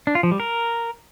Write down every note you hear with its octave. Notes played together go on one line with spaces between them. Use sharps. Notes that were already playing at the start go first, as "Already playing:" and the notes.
D4
F4
F3
G3
A#4